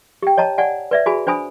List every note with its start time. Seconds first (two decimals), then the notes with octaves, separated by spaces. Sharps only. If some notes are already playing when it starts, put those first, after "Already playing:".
0.22 G4 G5
0.37 C#5 D#5 A5 A#5
0.58 D5 F#5 G#5
0.91 B4 D5 E5
1.06 F#4 G#4 G#5 B5
1.27 D4 C5 G#5 B5 D#6